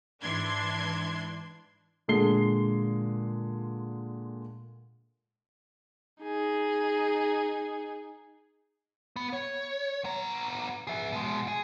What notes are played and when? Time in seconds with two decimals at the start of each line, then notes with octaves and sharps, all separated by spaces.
0.22 G#2 E3 D4 C6 G#6
2.08 A#2 D3 G#3 C7 G7
6.22 D#4 G#4
9.16 B3
9.33 C#5
10.04 B3 A#5
10.87 G#4 E5
11.12 B2 G#3
11.48 G#4